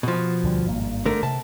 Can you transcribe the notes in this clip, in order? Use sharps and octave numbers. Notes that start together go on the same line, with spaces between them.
B2 F3
D2 D3 G3
G#1 G2 A#3
D3 A3 A#4
C3 A5